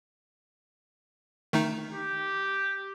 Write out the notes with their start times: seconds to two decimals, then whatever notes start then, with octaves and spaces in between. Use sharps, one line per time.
1.53 D#3 A3 D#4
1.93 G4